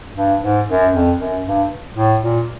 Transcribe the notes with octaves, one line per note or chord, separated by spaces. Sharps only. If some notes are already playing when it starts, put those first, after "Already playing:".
G2
G#2
F#2
F2
F#2
G2
A2
A#2